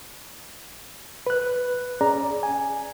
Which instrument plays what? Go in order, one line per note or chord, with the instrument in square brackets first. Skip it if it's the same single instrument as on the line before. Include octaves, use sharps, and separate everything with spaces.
[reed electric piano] B4 F#6
C#4 G#4 D5 A#5
G#5